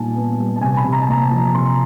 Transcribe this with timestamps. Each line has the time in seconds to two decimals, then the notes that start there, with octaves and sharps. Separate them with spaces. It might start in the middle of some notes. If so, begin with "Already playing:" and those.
Already playing: A#2 G3 B3 D#4 G#5 A5
0.15 B3
0.38 G3
0.56 A5
0.61 C3 G#5
0.77 B5
0.84 C3
0.93 A#5
1.02 A5
1.08 A#3 A#5
1.31 F3
1.55 C3 C6